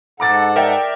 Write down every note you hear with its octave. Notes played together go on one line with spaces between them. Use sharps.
G#2 A4 F#5 A#5 D6 A6
A#4 D5 E5 G5